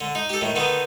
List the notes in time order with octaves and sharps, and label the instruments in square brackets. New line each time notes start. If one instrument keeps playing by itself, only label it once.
[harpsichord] D3
D#4
G4 A4
A2 D#3
D3 D#3 B3 D#4